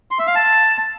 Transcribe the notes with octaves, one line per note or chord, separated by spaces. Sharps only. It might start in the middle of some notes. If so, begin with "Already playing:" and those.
C6
E5
F5
A5